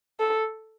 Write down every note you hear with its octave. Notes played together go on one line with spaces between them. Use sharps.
A4